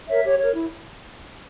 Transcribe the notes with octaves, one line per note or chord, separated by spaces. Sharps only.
A#4 C#5 E5
G4 C#5
A#4 C#5
E4